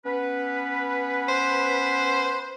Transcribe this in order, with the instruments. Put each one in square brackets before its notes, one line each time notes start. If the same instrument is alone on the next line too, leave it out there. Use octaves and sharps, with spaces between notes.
[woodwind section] B3 C#4 B4
[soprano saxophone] C5